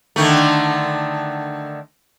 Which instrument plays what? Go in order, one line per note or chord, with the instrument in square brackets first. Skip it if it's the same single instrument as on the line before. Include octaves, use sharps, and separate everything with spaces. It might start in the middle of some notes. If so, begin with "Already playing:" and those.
[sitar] D3 D#3 A3